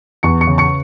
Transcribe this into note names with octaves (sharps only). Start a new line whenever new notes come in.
E2 C#6 C#7
C#6 C#7
C#3
C#6 C#7